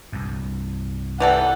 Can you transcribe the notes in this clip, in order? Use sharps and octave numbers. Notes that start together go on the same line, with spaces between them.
C2 G2
E3 G3 A4 F#5